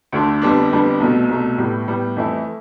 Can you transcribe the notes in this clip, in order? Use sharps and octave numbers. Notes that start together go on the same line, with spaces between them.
D2 D3 A3 D4
F2 D3 G3 B3 D4
F2 D3 G3 B3 D4
C2 B2 A3
C2 B2 A3
A2 G3 B3
A2 G3 B3
F2 E3 A3 E4